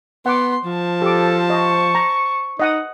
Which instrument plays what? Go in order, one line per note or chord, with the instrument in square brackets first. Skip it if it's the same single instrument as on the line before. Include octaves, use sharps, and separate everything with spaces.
[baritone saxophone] B3 [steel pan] F#5 D6 [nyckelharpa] C6
[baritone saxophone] F3 [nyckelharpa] C5 A5
[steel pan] G4 D6 [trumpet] A4
[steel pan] D#5 [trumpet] C#6
[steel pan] A#5
[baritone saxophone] D#4 [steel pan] D#5 F#5 D#6